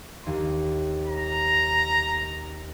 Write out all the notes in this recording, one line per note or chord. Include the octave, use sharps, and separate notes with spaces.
D#2 C6
A#5